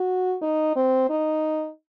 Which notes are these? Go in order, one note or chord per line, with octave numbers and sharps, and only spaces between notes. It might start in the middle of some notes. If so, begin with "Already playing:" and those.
Already playing: F#4
D#4
C4
D#4